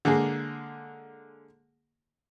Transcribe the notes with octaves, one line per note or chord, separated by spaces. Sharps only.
D3 G#3 A#3 G#4